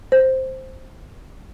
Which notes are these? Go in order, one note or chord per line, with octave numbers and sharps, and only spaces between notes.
C5